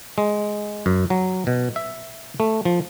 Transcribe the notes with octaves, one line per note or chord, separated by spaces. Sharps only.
G#3
F#2
F#3
B2
E5
A3
F3